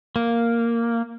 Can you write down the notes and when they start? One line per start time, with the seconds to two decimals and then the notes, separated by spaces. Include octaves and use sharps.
0.16 A#3